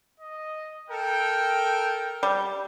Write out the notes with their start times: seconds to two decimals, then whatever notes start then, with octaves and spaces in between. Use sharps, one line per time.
0.20 D#5
0.89 A4 A#4 G5
2.23 G3